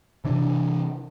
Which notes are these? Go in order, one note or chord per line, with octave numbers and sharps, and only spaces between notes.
C3 E3 D4